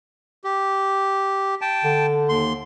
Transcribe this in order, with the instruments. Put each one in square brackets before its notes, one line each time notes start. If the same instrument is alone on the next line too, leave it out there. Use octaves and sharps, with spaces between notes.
[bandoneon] G4
G5 A5
[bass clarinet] D3
[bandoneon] D#2 C6